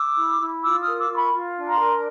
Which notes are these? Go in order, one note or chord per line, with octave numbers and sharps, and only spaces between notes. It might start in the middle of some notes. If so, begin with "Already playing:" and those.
Already playing: D6 E6
E4
E4
F4 D6 E6
D#6 F6
A#4
D6 E6
F4 D6
B5 C#6
F4
D4
A#5 C6
A#4